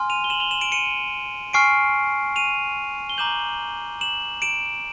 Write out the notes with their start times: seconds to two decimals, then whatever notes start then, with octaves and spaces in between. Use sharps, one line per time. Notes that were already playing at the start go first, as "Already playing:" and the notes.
Already playing: G#5 C6 F6
0.10 D#7 F7
0.24 G7
0.30 E7 F#7
0.40 F7 G7
0.51 E7 F#7
0.61 D7 E7
0.72 C#7 D#7
1.53 G#5 C#6 F6 C7 D7
2.36 D#7 F7
3.10 G7
3.18 A#5 D6 G6 E7 F#7
4.01 E7 F#7
4.42 D7 E7